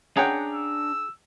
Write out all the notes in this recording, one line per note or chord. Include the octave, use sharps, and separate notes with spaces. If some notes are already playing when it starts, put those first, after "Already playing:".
C#4 D4 G#4 F#5 G5 A#5
E6